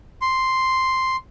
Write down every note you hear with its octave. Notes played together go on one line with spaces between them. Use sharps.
C6